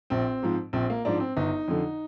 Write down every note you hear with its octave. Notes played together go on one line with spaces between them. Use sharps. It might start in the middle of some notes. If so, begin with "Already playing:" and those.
A#1 C4
G#2 F3
A#1 C4
A#3
G#2 F3 D4
C4
G1 D#4
F2 D3